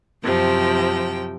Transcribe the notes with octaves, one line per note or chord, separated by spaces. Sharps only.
F#2 C3 F3 G5